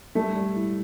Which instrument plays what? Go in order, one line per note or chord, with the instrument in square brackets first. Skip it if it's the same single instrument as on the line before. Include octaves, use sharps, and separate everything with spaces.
[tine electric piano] G3 [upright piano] A3
[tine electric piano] G3
E4